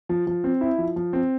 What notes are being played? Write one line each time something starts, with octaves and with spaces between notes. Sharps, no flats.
F3
F3
C4
E4
F3
F3
C4